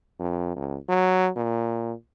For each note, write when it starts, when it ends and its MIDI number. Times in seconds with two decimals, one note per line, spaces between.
0.20 0.54 41
0.56 0.76 37
0.89 1.29 54
1.36 1.93 46